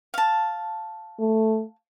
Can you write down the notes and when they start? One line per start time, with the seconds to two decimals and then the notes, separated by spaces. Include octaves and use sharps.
0.14 F5 A5
1.19 A3